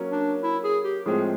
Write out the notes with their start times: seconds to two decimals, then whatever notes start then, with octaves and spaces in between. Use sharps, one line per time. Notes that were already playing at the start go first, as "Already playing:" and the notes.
Already playing: F#3 A#3 C#4
0.12 D4
0.43 E4
0.64 G#4
0.84 G4
1.05 A2 F3 G#3 C4 G#4